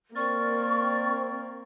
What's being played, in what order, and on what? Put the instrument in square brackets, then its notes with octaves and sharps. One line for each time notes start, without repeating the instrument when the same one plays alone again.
[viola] A#3 [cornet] C4 [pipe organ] A#4 D5 A6 [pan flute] C#6